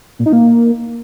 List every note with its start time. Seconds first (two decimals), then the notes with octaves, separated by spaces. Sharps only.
0.19 A#2
0.26 D#4
0.33 A#3